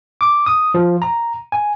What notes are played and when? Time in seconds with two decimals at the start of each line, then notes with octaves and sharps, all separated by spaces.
0.21 D6
0.46 D#6
0.74 F3
1.02 A#5
1.52 G#5